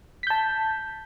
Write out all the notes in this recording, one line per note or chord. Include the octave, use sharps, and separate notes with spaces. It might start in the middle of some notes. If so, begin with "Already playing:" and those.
A5 G6 B6